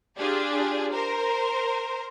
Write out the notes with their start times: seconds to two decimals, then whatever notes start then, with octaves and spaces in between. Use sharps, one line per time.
0.18 D4 F4 G4 G#4 D5
0.92 A#4 C5